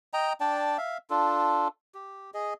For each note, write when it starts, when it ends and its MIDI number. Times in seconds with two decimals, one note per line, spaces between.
0.13 0.33 75
0.13 0.33 79
0.13 0.33 82
0.40 0.77 62
0.40 0.77 74
0.40 0.77 79
0.40 0.77 81
0.78 0.98 76
0.78 0.98 77
1.10 1.68 62
1.10 1.68 65
1.10 1.68 69
1.94 2.31 67
2.34 2.54 68
2.34 2.54 75